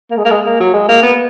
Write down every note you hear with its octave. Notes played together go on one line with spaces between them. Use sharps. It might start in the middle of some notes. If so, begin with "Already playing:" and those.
A#3
G#3
A#3
G#3
A#3
F#3
G#3
A#3
B3